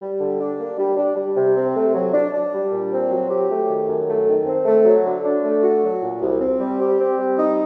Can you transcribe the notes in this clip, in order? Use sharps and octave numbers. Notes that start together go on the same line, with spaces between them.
G3
D3
D4
A#3
G3
D4
G3
C3
C4
A3
F#3
D4
D4
G3
A#2
C4
F#3
G4
A3
D#3
F#2
A3
D#3
C4
A3
F#3
D3
D4
A3
F#4
F#3
A#2
C2
C4
G3
G4
C4
G3
D#4